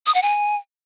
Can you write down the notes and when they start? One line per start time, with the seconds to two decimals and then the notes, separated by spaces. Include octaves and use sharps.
0.06 D#6
0.14 F#5
0.23 G#5